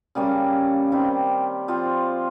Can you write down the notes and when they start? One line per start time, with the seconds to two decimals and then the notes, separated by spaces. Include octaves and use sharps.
0.15 C#3 G3 A#3 C#4
0.92 D#3 G3 C4 G4
1.68 F3 C4 F4